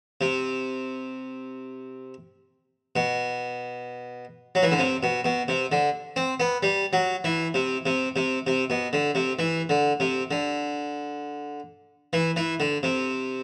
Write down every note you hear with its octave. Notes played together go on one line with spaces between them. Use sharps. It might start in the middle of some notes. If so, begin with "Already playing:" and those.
C3
B2
F#3
E3
D3
C3
B2
B2
C3
D3
C4
B3
G3
F#3
E3
C3
C3
C3
C3
B2
D3
C3
E3
D3
C3
D3
E3
E3
D3
C3